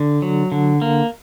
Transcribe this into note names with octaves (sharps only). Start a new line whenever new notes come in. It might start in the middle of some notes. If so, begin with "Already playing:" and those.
Already playing: D3
F#3
D3
A#3